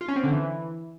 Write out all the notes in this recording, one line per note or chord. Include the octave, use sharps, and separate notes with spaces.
F4
C#4
C4
D3
E3